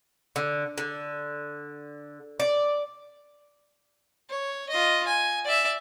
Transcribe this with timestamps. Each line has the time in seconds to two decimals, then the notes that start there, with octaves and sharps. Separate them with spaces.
0.36 D3
0.78 D3
2.40 D5
4.29 C#5
4.69 F4 D#5
5.07 G#5
5.44 D5 E5